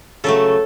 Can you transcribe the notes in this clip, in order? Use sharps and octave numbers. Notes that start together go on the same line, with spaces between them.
C#3 F#3 A3 A4